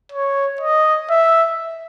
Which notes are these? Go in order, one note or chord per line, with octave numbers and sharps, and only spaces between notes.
C#5
D#5
E5